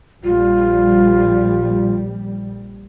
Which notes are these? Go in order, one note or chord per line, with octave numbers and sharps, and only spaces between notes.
A#1 G3 F4